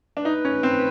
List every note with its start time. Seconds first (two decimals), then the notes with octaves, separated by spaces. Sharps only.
0.17 D4
0.25 D#4 B4
0.45 C#4
0.63 C4